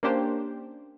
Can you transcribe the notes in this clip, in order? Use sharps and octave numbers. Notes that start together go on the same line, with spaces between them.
A#3 C#4 D4 G4 C5